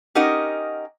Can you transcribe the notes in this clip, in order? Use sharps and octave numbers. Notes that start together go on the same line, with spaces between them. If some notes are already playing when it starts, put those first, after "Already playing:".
C#4 D#4 G4 A#4 D#5 F#5